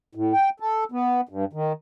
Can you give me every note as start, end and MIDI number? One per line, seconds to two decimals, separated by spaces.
0.15 0.33 45
0.33 0.50 79
0.60 0.84 69
0.92 1.21 59
1.29 1.45 43
1.53 1.73 51